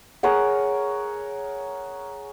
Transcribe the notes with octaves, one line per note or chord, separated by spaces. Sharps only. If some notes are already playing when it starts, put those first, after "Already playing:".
G#4 A#4 C#5 F#5